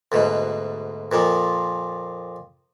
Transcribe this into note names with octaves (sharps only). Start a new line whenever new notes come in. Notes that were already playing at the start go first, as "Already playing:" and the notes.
D2 G#2 B2
F2 A#2 F3